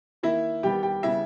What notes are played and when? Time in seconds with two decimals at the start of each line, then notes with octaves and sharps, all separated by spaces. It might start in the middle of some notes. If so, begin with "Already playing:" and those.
0.23 D#3 A#3 E4 E5
0.63 D#3 G3 B3 G4 G5
0.83 G4 G5
1.03 C#3 G3 B3 E4 E5